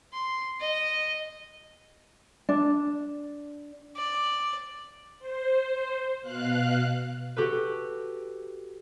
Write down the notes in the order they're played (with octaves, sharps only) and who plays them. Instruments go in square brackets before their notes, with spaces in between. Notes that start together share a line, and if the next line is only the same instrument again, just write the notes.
[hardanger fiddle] C6
D#5
[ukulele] D4
[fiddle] D5
[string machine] C5
B2 F5 F#6
[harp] F#4 G4 A4 B4